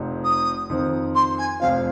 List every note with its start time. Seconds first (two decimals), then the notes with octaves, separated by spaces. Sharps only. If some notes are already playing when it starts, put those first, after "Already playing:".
Already playing: F1 F2 F3 C4 D#4
0.24 D#6
0.70 F2 D#3 C4
1.15 C6
1.38 G#5
1.60 F1 F2 F3 C4 F4 F5